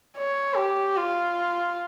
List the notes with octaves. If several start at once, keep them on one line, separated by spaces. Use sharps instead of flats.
C#5
G4
F4